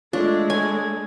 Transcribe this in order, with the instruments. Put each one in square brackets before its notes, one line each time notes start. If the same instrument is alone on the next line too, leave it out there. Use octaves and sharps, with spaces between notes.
[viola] G#3 A3 [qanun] D4 [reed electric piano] F4 C#5
[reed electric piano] C#5 [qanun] G#5